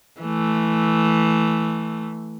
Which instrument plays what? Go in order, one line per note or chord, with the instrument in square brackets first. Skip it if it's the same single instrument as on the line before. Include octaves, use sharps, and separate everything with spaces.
[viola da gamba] E3 A3